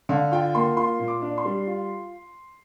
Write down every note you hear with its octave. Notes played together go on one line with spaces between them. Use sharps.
D3 F5
F4 G5
A#3 C6
F4 C6
A#2
D6
D4
C6
G3
F4